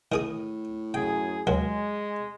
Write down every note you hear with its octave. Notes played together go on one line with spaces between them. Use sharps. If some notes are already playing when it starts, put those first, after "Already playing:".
A2 D#3 G#4 D#6
F#2 G#4 G5
D#2 F#3 G#3